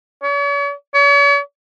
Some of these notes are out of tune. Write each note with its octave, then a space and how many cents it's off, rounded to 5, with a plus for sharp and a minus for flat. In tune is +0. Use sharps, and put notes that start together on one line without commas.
C#5 +45
C#5 +40